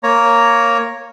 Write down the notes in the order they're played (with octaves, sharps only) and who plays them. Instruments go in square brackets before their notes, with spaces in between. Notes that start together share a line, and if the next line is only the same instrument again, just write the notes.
[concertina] A#3 C#5 A#5